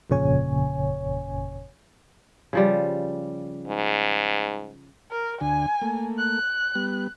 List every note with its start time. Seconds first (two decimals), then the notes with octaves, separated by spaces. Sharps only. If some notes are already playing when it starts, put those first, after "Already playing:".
0.10 G1 F2 A#2 C#3 C#5 G#5
2.53 C#3 F3 G3
3.67 G#2
5.11 A#4
5.41 D2 D3 G#5
5.82 A3 A#3
6.18 F#6
6.75 G3 B3